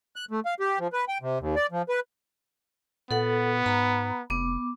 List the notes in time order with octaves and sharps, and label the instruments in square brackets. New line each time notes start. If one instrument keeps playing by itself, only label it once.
[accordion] F#6
A3
F5
G4
F3
B4
G5
C3
D#2
D5
F3
B4
[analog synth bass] A#2 [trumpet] B3 [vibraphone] A4 F#5
[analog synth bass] G#2 [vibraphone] A#5 B5
[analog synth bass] F1 [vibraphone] B3 D6